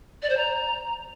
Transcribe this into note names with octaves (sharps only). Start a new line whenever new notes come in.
D5
C5
A#5